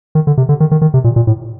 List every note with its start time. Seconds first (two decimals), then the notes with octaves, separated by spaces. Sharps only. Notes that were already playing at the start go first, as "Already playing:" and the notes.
0.15 D#3
0.27 D3
0.37 C3
0.49 D3
0.60 D#3
0.71 D#3
0.82 D#3
0.94 C3
1.04 A#2
1.16 A#2
1.27 A2